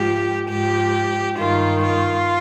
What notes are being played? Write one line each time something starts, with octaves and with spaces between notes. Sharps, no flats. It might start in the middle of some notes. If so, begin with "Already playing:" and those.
Already playing: G#2 F3 G4
G#2 F3 G4
G2 D#3 F4
F4